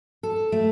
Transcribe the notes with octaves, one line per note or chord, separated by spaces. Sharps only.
A4
A3